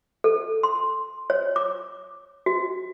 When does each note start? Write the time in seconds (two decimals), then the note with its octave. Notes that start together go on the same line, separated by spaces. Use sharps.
0.24 A4
0.63 C6
1.30 C#5
1.56 D6
2.46 F#4